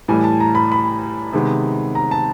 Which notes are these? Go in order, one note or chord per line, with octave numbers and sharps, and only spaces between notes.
A2 E3 G3 G#5
A5
A#5
B5
B5
C3 D#3 G#3 B3
A#5
A5